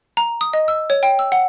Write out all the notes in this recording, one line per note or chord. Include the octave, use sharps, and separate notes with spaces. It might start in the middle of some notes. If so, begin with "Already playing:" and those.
A#5
D#6
D#5
E6
C#5
G5
E6
F#5